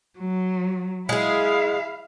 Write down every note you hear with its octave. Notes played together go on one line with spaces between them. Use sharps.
F#3
G#3 E4 G#4 F5